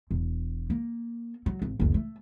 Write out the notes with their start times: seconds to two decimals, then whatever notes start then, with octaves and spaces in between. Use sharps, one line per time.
0.11 E1
0.70 A#3
1.46 F#3
1.62 G#1
1.80 F#1 D2
1.94 A3